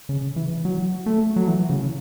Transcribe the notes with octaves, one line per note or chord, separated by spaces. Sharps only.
C#3
E3
F#3
A3
F#3
E3
C#3